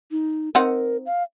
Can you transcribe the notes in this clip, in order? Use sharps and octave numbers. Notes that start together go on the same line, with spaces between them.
D#4
C4 D#4 A#4 F#5
F5